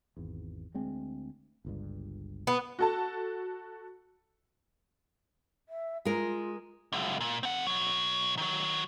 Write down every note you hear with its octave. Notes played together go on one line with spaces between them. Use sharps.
G#1 E2
D2 G#3 C4
G1 C#2 G2
B3
F#4 A4 A5
E5
G#3 F4 A#4
C#2 F#2
A#2
C4 F#5
B2 F#3
D#3 F#3